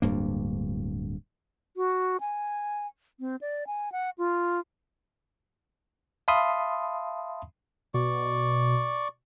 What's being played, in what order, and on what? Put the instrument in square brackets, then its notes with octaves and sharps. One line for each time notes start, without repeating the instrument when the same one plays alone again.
[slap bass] D1 D2 G2 A#3
[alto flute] F#4
G#5
C4
D5
G#5
F#5
F4
[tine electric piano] E5 F5 A5 B5 C6 D#6
[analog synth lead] B2 [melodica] D5 C#6